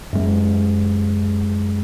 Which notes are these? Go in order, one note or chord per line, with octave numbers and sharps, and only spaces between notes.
F#2 G#3